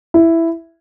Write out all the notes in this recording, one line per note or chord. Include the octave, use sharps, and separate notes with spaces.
E4